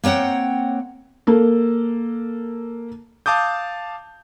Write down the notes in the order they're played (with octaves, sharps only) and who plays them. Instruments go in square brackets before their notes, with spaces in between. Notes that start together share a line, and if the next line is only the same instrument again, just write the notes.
[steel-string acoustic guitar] A#3 C4 C#5 F#5 G5
[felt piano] A#3 A4
[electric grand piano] F5 A5 D6 D#6 G6